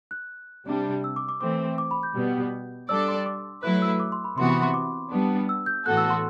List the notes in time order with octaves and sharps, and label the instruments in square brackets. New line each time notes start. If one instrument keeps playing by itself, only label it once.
[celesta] F#6
[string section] C3 G3 D4
[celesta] E6
D6
D6
[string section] E3 A3 C4 [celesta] D6
[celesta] D6
B5
G6
[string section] B2 G3 B3
[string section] G3 D4 A4 D5 [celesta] E6
[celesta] C6
D6
[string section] F#3 A3 E4 B4 [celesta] F#6
[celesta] E6
D6
C6
B5
[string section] C3 E3 B3 F#4 [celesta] C6
[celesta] B5
C6
D6
[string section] G3 B3 D4
[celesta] E6
G6
[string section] A2 E3 B3 F#4 A4 [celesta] F#6
[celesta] E6
C6